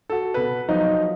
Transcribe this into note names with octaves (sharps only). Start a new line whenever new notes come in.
F#4 A4
B2 B4
F3 F#3 D#4 D#5